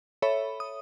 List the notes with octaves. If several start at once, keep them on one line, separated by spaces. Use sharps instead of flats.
A4 C#5 E5 B5
D#6